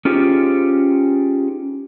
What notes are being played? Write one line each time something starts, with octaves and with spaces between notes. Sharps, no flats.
C#4 D#4 F4 G4 G#4 C5